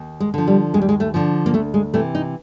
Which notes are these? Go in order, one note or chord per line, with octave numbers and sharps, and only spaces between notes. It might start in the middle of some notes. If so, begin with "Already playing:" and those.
Already playing: D#2
G#3
D3 F3
G3
D#2 G#3
G3
G#3
A3
D3 F3
A#3
D2 A3
G#3
C3 E3 A3
D#4